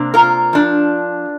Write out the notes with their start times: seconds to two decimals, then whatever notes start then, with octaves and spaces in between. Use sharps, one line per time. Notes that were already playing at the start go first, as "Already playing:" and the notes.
Already playing: C3 A#3 D4
0.14 F4 A#4
0.53 F3 D4